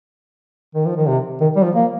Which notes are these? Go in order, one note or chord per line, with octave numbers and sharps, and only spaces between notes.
D#3
F3
D#3
C3
D#3
G3
F3
A#3